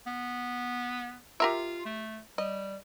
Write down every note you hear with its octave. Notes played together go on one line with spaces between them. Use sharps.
B3
F4 G4 A#4 E5
A3
G3 D#5